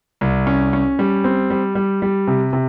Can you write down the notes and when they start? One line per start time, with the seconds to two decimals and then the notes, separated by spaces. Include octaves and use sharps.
0.21 C2
0.47 C#4
0.73 C#4
0.99 G3
1.24 C4
1.50 G3
1.75 G3
2.02 G3
2.28 C3
2.53 C3